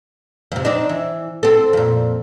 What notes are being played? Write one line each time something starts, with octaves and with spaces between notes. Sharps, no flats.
F2 C3
C4 D4 D#4
E3
C4 A4
F2 A#2